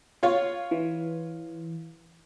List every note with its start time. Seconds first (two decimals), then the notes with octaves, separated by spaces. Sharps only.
0.23 F4 C#5 F5
0.71 E3